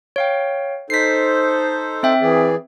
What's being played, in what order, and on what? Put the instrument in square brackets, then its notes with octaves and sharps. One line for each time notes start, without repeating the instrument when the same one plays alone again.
[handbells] C#5 F5 G5
[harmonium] D#4 A4 C5 [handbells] B6 C7
[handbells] C4 E5 G5
[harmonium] E3 G#4 D5